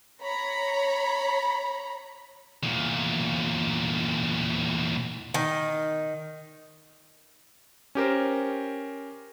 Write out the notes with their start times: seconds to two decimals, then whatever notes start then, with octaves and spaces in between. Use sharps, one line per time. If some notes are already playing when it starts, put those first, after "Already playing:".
0.22 C#5 A#5 B5
2.63 E2 A#2
5.34 D#3
7.95 C#4 G4 A#4 C5